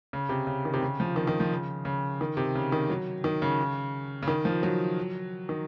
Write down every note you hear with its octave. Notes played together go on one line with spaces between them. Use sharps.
C#3
C3
C#3
D#3
C3
C#3
F3
D#3
D#3
F3
C#3
C#3
D#3
C3
C#3
D#3
F#3
D#3
C#3
C#3
D#3
F3
F#3
D#3